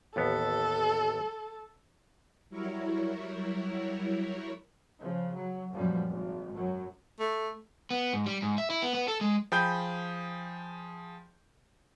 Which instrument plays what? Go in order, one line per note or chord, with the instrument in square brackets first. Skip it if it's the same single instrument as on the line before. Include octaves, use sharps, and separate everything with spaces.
[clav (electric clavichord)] A1 D#2 B3 [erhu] A4
[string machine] F#3 G3 E4 A#4 C#5
[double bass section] C#3 F3
F#3
F#2 A#2 F3 G3
G#1
F#2 F#3
[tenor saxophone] A3
[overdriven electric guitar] B3
G#2
G3
G#2
E5
E4
B3
B3
A4
G#3
[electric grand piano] F3 G#4 G5 B5 G6